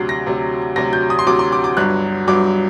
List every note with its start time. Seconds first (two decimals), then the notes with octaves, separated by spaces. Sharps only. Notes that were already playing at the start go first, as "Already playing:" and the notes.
Already playing: D2 C3 F#3 C7
0.09 A#6
0.26 D2 C3 F#3
0.76 D2 C3 F#3 A#6
0.93 G6
1.10 D#6
1.19 C6
1.27 D2 C3 F#3 D6
1.39 C6
1.52 D6
1.64 D6
1.77 G1 G2 F#3 F#6
2.28 G1 G2 F#3 D6